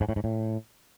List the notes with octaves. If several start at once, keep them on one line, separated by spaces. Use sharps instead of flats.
G#2
A2
G#2
A2